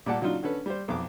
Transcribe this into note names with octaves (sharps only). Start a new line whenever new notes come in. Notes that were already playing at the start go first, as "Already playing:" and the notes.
A#2 G3 D5 F#5 A5
C#3 F#3 D4 D#4 F4
D3 C#4 A4 B4
G3 C5
B1 F2 D6